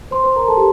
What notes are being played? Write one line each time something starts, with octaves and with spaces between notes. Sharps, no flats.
C5 C6
C5 C6
A#4 A#5
A4 A5
G4